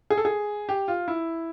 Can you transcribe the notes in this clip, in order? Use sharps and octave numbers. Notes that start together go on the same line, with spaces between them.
G#4
A4
G#4
G4
F4
E4